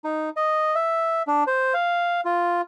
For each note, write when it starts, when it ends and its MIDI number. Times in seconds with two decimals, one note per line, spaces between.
0.04 0.29 63
0.37 0.75 75
0.75 1.22 76
1.27 1.44 62
1.47 1.74 72
1.74 2.21 77
2.25 2.61 65